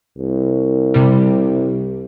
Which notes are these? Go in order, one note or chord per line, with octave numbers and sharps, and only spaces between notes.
C2
C3 G3